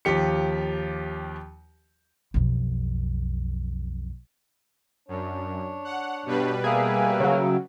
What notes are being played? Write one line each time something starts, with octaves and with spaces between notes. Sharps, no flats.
D#2 F3 G4 C#7
B1 F2
F#2 D4 C#5
F#5
G2 B2 G3 B4
A#3 G#4 E5 F5 G5
C#3 F#3